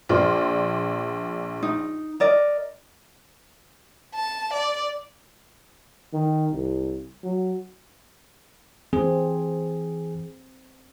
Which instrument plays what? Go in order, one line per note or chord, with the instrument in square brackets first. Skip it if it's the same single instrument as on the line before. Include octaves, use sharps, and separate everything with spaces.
[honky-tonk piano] A#1 D5 C6 [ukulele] F4
[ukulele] D#4
A#4 D5 D#5
[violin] A5
D5
[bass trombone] D#3
C2
F#3
[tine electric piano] E3 G#4 [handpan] C4